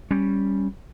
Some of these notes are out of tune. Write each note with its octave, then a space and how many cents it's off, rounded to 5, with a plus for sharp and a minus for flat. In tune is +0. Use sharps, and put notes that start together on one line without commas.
G3 +0 C#4 +0